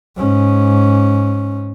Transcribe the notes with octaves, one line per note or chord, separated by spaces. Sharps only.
G#2 C#4